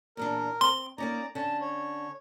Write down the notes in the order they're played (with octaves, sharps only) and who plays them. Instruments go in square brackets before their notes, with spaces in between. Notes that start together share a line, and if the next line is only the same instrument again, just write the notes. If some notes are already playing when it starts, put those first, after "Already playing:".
[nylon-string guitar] E2 A#2 D4 [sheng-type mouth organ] A#4
[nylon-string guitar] C4 [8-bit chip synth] C6
[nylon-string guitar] A#3 C#4 D#4 [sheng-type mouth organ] D5 A#5
[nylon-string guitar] D3 C#4 [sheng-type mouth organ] A5
[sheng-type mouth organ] C#5